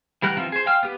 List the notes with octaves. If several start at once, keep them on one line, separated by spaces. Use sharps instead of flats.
E3 G3 A#4 F#5 F#6
E3 F3 C4 F4
G#4 C5
F5 G5 F6
B3 G4 B4